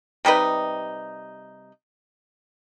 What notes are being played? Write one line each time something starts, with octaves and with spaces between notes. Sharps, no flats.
C3 G3 D#4 B4